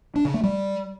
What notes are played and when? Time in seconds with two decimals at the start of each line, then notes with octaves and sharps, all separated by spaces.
0.16 D4
0.25 C#3
0.34 A3
0.43 G3